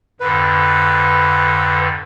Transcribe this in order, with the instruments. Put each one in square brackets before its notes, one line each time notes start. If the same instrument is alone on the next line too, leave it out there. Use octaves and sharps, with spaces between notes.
[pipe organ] F2 G#2 D3 [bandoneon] B4